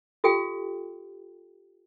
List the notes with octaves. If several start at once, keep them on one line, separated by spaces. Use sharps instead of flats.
F4 G4 A4 F5 G5